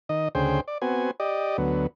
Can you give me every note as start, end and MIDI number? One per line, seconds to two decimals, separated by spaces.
0.09 0.28 51
0.09 0.28 75
0.35 0.60 38
0.35 0.60 49
0.35 0.60 68
0.35 0.60 72
0.35 0.60 79
0.68 0.78 74
0.82 1.11 59
0.82 1.11 60
0.82 1.11 66
0.82 1.11 80
1.20 1.57 67
1.20 1.57 74
1.20 1.57 75
1.58 1.87 38
1.58 1.87 54
1.58 1.87 59